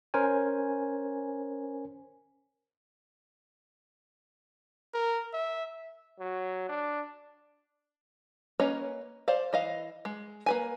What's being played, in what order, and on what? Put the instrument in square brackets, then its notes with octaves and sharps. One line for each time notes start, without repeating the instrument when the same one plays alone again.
[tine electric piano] C#4 A#4 C5 G#5
[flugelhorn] A#4
E5
[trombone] F#3
D4
[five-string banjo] A#3 C#4 B4 C#5 D#5
C5 D5 F5
E3 D#5 F5
G#3
A#3 B4 G#5